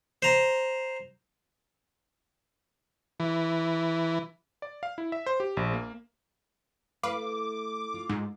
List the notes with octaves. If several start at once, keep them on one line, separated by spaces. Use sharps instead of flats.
C5 A#5
E3
D5
F5
E4
E5
C5
G4
A#1
A#3
A3 E4 B4 F5 D6
F4
G#2